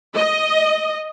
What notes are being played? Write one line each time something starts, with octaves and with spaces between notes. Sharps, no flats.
D#5